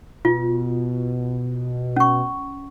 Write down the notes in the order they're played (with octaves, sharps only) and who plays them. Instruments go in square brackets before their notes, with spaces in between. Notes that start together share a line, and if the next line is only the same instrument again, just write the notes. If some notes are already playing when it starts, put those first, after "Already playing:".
[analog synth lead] B2 [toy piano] F4
[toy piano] C#4 C#6